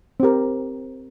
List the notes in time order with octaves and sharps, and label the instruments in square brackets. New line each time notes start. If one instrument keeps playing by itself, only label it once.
[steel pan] C4 G4 A#4